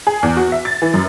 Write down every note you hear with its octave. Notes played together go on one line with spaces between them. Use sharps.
G#4
E2
F#4
E5
A6
E3
F#2